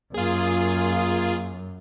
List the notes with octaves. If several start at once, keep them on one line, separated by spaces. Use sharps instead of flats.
F#2 A#3 F4 G#4